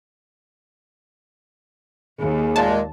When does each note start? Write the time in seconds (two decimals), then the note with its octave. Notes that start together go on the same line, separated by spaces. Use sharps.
2.20 D#2 G#4
2.56 A#2 G#3 A5